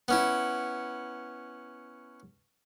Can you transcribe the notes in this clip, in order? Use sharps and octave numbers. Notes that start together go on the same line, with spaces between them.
B3 C#4 E4